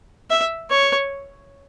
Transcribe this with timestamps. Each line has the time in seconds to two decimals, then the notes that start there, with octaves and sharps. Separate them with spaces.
0.30 E5
0.70 C#5